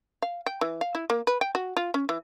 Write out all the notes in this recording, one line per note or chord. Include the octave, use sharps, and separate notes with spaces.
F5
G5
E3
F5
E4
A#3
B4
G5
F#4
F4
C#4
E3